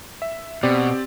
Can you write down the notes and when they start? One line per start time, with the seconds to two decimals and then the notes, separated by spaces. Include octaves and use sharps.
0.22 E5
0.63 B2 C4 G4 D5